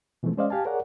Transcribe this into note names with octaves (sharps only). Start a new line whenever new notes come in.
B2 E3 F3 G#3 A3 C4
G#3 C#4 C5 D5 D#5 F5
G4 F5 G#5 A5
G#4 A#4 C#5 D5 F#5